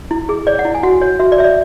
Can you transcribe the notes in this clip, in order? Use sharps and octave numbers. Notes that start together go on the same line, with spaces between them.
E4
G#4
C#5 D5
F#5
E4
G#5
F#4 F#5
C#5
F#4 E5
D5
C#5 E5
D5